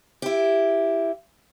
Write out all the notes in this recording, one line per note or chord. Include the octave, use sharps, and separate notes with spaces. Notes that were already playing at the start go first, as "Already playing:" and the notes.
E4 G4